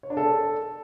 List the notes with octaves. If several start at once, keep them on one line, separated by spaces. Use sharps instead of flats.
C#5
D4
A4